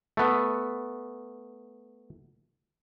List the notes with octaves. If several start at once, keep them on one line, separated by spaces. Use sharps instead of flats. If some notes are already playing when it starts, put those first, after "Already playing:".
A3 B3